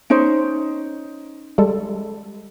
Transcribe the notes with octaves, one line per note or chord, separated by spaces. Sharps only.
C#4 D#4 C5 D7
G3 G#3 A4